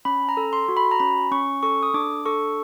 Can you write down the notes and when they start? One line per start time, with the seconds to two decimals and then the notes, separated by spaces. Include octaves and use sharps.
0.05 C#4 B5
0.29 A#5
0.37 A4
0.53 C6
0.69 F#4
0.77 B5
0.91 A#5
1.00 C#4 B5
1.31 C#4 C#6
1.63 A4 C#6
1.83 D#6
1.94 D4 D6
2.26 A4 C#6